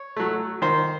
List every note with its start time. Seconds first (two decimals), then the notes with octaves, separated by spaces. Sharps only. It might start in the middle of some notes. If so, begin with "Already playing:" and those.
Already playing: C#5
0.17 F#3 A3
0.62 D#3 C5